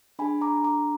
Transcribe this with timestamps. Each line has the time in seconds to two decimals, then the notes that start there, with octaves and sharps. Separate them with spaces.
0.19 D4 G#4 G#5 B5
0.41 A#5 D6
0.64 A#5 D6